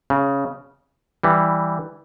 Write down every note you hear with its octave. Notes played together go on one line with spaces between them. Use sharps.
C#3
E3 G3